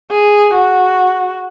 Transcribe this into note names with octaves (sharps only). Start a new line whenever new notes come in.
G#4
F#4